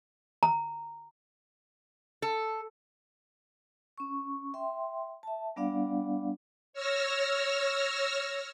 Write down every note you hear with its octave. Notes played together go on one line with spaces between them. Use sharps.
A#5
A4
C#4 C#6
E5 G5 C6
E5 A5
G3 B3 D4 D5 F5 F#5
C#5 E6 F6 A#6